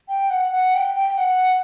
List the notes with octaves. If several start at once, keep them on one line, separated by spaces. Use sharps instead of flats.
G5
F#5
F#5
G5
G5
F#5